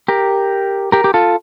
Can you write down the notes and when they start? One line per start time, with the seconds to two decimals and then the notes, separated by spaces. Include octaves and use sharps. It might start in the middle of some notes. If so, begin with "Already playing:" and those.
0.08 G4 A#4
0.92 G4 A#4
1.04 G4
1.14 F4 A4